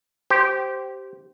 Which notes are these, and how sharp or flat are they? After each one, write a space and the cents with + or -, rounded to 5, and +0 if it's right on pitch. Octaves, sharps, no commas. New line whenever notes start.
G4 -15 C5 +0